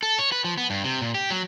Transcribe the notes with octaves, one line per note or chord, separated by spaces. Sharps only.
A4
C#5
B4
F3
B3
G2
C3
A#2
G4
F#3